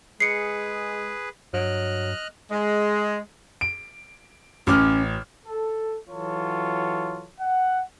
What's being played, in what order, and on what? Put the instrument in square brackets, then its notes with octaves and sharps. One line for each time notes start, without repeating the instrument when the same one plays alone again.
[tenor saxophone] G#3 [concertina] G#4 B4 [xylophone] C7 C#7
[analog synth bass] G2 [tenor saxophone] F#3 [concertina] D#5 F6 F#6
[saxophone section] G#3
[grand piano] D7
[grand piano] A1 D6 F6 [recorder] C#4
[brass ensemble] A4
E3 F#3 F4 A4 C#5
F#5